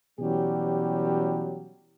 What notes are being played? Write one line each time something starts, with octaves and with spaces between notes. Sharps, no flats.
B2 E3 F#3 G3 C#4 G4